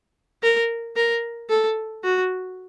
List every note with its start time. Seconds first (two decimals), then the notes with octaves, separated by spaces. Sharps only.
0.42 A#4
0.96 A#4
1.49 A4
2.03 F#4